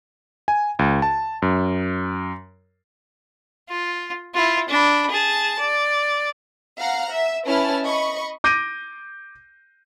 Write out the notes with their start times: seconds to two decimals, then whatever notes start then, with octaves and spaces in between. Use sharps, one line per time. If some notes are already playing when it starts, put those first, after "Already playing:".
0.48 G#5
0.79 C#2
1.02 A5
1.42 F#2
3.69 F4
4.34 E4 F4
4.68 D4 B5
5.10 G#4 A5
5.59 D5
6.78 F5 F#5 A#5 F6
7.12 E5
7.47 C#4 E4 B4 A5 F6 A6
7.84 D#5 B5 C#6
8.44 D6 G6 A#6 D7 D#7